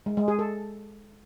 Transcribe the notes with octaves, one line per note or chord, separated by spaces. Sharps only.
G#3
G#3
G#4
A4